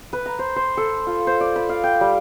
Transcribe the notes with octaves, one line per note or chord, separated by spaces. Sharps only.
B4
A#5
C5
C5
A4
F4
C5
D5
B5
F5
G5
G3